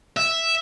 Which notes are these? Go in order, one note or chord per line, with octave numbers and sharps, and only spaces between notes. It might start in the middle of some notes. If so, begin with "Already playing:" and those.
E5